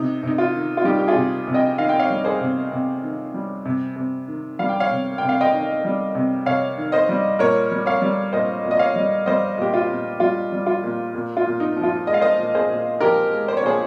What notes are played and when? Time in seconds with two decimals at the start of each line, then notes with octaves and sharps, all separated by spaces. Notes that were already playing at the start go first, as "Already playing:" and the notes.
Already playing: C3 D#4
0.23 C3 D#4
0.38 F4
0.54 D#3
0.77 F4
0.84 G3 D#4 G4
0.98 G4
1.08 F4 G#4
1.15 C3
1.47 C3
1.54 D#5 G5
1.78 D#3 F5
1.89 G5
1.99 C#5 F5
2.10 G3
2.24 G#4 C5
2.40 C3
2.72 C3
3.03 D#3
3.34 G3
3.65 C3
3.96 C3
4.28 D#3
4.59 G3 F5
4.69 G5
4.80 C#5 F5
4.91 C3
5.18 C3 G5
5.29 F5
5.41 D#5 G5
5.53 D#3
5.84 G3
6.15 C3
6.46 C3 C#5 F5
6.78 D#3
6.92 C5 D#5
7.09 G3
7.39 A#2 A#4 C#5
7.71 G3
7.86 C#5 F5
8.02 G3
8.33 A#2 C5 D#5
8.64 A#2
8.71 D#5
8.79 C#5 F5
8.96 G3
9.26 G3 C5 D#5
9.58 A#2 G4
9.73 F4
9.89 A#2
10.20 G3 F4
10.52 G3
10.66 F4
10.83 A#2
11.14 A#2
11.37 F4
11.46 A#2
11.60 D#4
11.77 F3
11.83 F4
12.07 G#3 D#5
12.14 F5
12.21 C5 D#5
12.39 A#2
12.55 G#4 C5
12.70 A#2
13.00 F3 G4 A#4
13.33 G#3
13.48 C5
13.57 C#5
13.63 A#2 G#4 C5